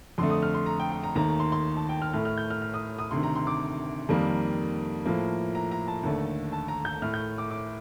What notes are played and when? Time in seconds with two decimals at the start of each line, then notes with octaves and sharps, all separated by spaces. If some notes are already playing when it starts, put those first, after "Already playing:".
0.18 F2 D3 A3 C6
0.30 D#6
0.42 F6
0.54 C6
0.66 A#5
0.80 G5
0.92 G5
1.03 A#5
1.15 D#2 D#3 A3 A#5
1.28 A#5
1.40 C6
1.52 C6
1.77 A5
1.89 G5
2.02 F6
2.13 A2 A3 F6
2.25 F6
2.37 G6
2.50 F6
2.62 F6
2.74 D#6
2.98 D#6
3.11 D2 C3 D#3 C6
3.23 A#5
3.35 C6
3.47 D6
4.09 F2 D#3 G3 A#3
5.06 A2 F3 A#3
5.55 A#5
5.71 A#5
5.88 A5
6.03 D#2 D3 A3
6.52 A5
6.68 A#5
6.85 G6
7.02 A2 A3 F6
7.14 G6
7.38 D6
7.50 D6